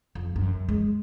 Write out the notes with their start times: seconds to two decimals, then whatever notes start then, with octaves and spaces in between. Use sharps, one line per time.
0.15 F2
0.36 F#2
0.69 G#3